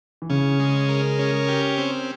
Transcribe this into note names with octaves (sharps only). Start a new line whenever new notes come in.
E3
C#3 C#4
G#3
A#4
C#4
G4
C4